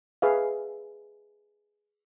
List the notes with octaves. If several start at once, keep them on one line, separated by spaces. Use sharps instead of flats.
G#4 B4 E5 F5